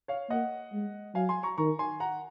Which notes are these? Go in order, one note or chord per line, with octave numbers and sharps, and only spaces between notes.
C#5 F5
A#3 D#5 F#5
G#3
F#3 F5 G#5
G#5 C6
A#5 C#6
D#3 A#5 C#6
G#5 C6
F#5 A#5